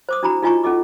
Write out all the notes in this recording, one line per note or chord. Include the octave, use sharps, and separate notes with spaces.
C5 D6 D#6
D4 E4 F#4 A#5 B5
D#4 F4 D#5 G#5 A#5 C#6
C#4 A4 D#5 D6